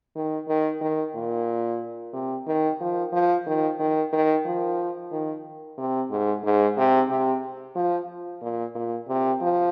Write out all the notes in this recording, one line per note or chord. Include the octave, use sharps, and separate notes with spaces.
D#3
D#3
D#3
A#2
C3
D#3
F3
F3
D#3
D#3
D#3
F3
D#3
C3
G#2
G#2
C3
C3
F3
A#2
A#2
C3
F3